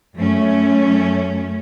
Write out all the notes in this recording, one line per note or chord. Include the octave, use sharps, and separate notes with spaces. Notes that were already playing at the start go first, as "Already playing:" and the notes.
F#2 A3 C#4